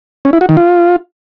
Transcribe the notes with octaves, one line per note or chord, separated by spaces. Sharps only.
C#4
E4
F#4
D#3
F4